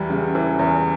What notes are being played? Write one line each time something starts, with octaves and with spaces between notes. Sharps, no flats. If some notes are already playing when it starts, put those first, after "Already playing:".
Already playing: E2 E3 G3
C#3
E3
E2